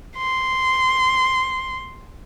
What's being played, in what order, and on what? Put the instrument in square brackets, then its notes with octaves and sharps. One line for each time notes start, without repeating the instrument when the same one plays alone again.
[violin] C6